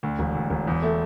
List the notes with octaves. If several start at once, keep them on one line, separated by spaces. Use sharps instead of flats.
D2
E1
D2
E1
E2
A3